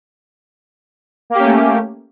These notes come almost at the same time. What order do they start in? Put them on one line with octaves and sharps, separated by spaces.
A#3 G4 C#4 A3